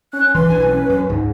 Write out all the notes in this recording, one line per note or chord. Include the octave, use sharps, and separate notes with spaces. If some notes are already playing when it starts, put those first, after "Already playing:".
C#4 F#6
E3 B4 C6
B1 E3 D4 G#5
C#4
F#2
C#2 G#2